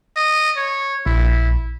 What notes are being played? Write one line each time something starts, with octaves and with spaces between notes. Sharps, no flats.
D#5
C#5
A#1 E4